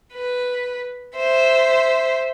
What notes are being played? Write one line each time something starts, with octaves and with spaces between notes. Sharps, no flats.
B4
C5 E5